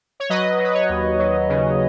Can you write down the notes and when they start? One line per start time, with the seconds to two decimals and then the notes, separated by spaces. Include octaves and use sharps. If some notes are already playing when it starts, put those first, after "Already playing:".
0.20 C#5
0.29 F#3 B4 D#5
0.59 F#3
0.64 B4
0.74 C#5
0.89 D#2
1.19 F#3
1.49 C#3